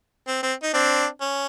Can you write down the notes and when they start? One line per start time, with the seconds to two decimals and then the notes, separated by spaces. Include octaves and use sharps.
0.28 C4
0.43 C4
0.63 D#4
0.74 C4 D4
1.20 C#4